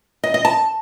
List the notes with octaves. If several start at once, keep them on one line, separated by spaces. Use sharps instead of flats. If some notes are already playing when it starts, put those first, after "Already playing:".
D#5
D#5
A5